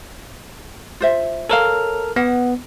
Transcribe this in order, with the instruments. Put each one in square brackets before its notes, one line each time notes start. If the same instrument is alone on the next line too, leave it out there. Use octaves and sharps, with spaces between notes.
[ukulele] F4 C5 E5
[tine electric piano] A4 A#4 F6 [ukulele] C#5 F5
[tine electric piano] B3 [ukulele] F#5